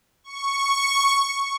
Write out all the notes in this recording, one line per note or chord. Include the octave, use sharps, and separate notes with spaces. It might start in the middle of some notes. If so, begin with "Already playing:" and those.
C#6